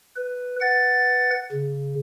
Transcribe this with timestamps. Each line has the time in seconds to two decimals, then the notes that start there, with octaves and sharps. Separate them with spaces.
0.17 B4
0.61 B4 F#5 A6
1.52 C#3